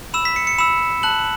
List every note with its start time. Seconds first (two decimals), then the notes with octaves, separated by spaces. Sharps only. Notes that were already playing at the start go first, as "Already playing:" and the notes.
0.14 B5 E6 E7
0.25 B6
0.36 C#7
0.47 C#7
0.58 B5 E6 E7
1.03 A5 F#6 F#7